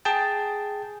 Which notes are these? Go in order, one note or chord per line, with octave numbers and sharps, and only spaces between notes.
G#4 G5 A5